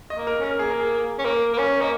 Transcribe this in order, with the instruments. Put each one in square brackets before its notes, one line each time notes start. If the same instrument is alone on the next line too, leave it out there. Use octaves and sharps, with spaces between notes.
[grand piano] D#5
[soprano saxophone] A#3
[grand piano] A#4
[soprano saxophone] C#4
[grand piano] A#4
[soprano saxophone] A#3 [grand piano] G#4
[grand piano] A#4
G#4
[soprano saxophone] C#4
[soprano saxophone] A#3 [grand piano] A#4
[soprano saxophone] A#3
C#4
[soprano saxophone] A#3 [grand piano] D#5